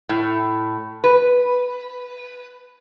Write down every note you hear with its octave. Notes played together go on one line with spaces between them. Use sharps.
A2
B4